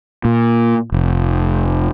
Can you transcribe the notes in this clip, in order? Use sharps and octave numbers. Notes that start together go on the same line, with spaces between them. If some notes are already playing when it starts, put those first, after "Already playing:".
A#2
F1